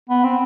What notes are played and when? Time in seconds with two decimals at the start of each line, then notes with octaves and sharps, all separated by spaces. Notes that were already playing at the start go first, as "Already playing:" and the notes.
0.09 B3
0.24 C4